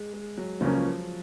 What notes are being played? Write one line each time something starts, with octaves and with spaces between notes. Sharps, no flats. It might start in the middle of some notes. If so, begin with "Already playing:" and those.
Already playing: G#3
G#3
F#3
C#2 C#3 F3 F#3 A#3 C#4